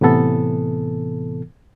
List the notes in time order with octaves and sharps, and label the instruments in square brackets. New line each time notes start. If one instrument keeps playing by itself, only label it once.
[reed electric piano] A2 C3 E3 B3 A4